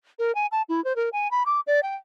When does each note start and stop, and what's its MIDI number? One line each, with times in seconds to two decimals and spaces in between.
0.19 0.34 70
0.35 0.47 80
0.52 0.62 81
0.69 0.83 64
0.84 0.95 72
0.96 1.09 70
1.13 1.30 80
1.31 1.43 83
1.46 1.60 86
1.67 1.80 74
1.83 1.95 79